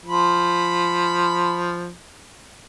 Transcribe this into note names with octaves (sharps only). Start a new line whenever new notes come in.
F3 B5